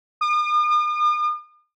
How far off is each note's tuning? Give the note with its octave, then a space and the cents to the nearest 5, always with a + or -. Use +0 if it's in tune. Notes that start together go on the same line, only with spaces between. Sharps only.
D#6 -45